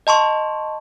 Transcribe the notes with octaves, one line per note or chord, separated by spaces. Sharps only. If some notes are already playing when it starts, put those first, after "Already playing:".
D#5 A5 C6 C#6